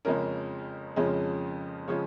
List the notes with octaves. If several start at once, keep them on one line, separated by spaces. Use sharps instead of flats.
F2 C#3 F3 G#3 C#4 A#4
F2 C#3 F3 G#3 C#4
C#3 F3 G#3 C#4 C#5